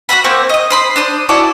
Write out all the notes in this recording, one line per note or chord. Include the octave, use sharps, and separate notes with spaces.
F#4 A4 F#5 B5
A#3 C4 C5 C#6
D#5 D#6
C5 B5 C6
D4 C5 D#6
E4 F#4 A4 D5